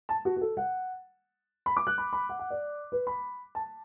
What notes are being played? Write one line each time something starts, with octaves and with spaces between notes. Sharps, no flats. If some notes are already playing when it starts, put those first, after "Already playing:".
A5
F#4
F#4
A4
F#5
B5
D6
F#6
B5
B5
F#5
F#5
D5
B4
B5
A5